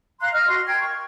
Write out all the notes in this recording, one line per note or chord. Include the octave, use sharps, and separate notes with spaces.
F5 A#5 C6 F#6
D#5 F6
F#4 C6
A#4 G5 F6 G#6
C#6